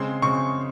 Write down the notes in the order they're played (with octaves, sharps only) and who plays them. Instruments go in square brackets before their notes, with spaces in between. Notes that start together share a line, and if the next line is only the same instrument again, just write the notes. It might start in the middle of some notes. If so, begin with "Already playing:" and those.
Already playing: [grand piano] C#3 G#3 C4 C6
C#3 G#3 C4 C#6